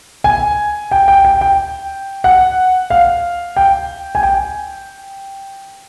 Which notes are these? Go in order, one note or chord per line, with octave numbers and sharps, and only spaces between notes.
G#5
G5
G5
G5
G5
F#5
F5
G5
G#5
G5